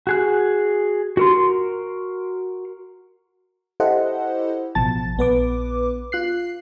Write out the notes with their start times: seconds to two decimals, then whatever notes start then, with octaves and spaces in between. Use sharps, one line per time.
0.07 F#4 G#4 F#6
1.17 F#4 A#4 C6
3.80 E4 G4 A4 C5 D#5 F#5
4.75 A1 B2 F3 A5 A6
5.17 A#1 B3 B4 D6
6.12 F4 F#6 C7